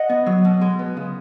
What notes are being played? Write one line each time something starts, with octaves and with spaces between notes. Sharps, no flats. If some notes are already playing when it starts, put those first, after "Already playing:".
Already playing: D#5 F#5
B3
F#3
B2
G#3
B3
C#3